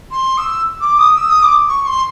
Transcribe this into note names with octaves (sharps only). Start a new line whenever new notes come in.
C6
E6
D6
D#6
E6
D#6
D6
C#6
C6